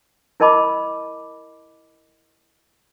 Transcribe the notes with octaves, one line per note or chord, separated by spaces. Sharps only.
E4 A#4 D#5 A5 B5 D6